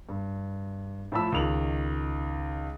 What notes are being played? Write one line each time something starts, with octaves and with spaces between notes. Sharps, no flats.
G2
A2 F3 A5 B5 E6
C#2 D#3 F7 F#7